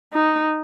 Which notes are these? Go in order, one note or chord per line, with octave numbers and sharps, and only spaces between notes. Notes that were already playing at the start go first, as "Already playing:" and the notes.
D#4